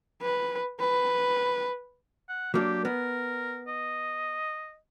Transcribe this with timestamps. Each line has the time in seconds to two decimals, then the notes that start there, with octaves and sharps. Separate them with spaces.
0.22 B4
0.79 B4
2.29 F#5
2.54 F#3 A#3 D4 G4
2.85 B3 A#4
3.68 D#5